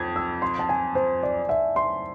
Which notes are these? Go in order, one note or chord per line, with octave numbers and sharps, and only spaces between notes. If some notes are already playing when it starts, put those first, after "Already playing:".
Already playing: F2 G#6
E6
C6
A5
G#5
C5
D5
E5
C6